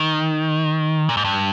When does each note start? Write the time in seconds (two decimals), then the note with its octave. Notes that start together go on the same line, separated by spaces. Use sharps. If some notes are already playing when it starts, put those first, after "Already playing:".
Already playing: D#3
1.09 A#2
1.17 G#2
1.24 G2